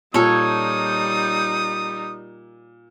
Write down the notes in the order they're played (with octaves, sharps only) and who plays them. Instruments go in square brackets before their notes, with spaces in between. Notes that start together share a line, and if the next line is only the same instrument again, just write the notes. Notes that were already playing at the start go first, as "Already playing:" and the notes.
[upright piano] A#2 [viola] G3 D#4 [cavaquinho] A4 C#5 [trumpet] D#6